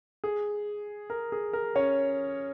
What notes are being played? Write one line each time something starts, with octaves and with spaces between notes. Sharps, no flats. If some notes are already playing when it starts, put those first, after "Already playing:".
G#4
A#4
G#4
A#4
C#4 C#5